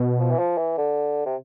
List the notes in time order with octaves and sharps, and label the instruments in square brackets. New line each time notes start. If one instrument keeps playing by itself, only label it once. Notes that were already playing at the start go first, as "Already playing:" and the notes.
Already playing: [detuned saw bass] B2
[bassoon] F3
E3
F3
E3
D3
C3